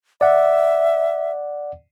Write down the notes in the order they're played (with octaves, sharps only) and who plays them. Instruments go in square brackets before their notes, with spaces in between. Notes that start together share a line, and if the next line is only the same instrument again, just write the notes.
[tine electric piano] D5 F#5 [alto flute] E5